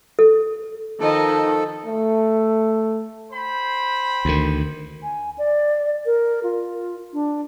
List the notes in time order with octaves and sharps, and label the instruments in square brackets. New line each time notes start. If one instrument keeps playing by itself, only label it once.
[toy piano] A4
[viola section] D#3 [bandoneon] F3 A4 [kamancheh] D#5
[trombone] A3
[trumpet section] C5 G5 B5
[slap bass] D2 D#3
[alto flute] G#5
D5
A#4
F4
D4